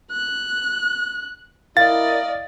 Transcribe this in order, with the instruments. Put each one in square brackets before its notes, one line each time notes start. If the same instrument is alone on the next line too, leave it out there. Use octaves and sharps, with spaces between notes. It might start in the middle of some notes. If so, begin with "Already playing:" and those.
[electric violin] F#6
[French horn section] E4 A#4 [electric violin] D5 D#5 [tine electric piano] F5 [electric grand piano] A6